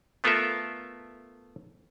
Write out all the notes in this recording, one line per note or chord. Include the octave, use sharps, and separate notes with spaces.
A3 B3 F4 A4 A#4 E5